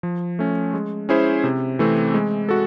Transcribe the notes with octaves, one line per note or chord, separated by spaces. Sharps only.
F3
A3 C#4
G#3
C#4 E4 G#4 C5
C3
E3 A3 C4
G#3
F#4 A4